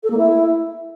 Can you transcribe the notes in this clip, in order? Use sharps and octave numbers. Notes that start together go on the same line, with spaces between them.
A4
A#3
E4